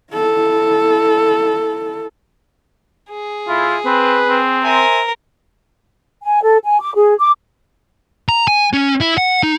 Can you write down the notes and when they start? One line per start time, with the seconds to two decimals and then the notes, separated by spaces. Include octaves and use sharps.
0.13 E4 A4
3.09 G#4
3.48 A2 E4 F4
3.85 C4 B4
4.28 C4
4.63 A#4 C5 E5 G#5
6.23 G#5
6.43 A4
6.64 G#5
6.81 D6
6.96 G#4
7.19 D6
8.29 A#5
8.48 G#5
8.73 C#4
9.01 E4
9.18 F#5
9.43 D#4